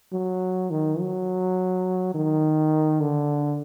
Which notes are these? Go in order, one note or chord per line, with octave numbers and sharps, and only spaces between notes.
F#3
D#3
F#3
D#3
D3